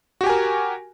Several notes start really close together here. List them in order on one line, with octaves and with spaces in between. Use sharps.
F#4 G4 G#5 A#4